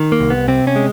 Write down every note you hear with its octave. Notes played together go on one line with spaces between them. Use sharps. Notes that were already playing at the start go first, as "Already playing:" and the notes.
Already playing: D#3
A#3
C2
B3
C3 C4
C#4
G#3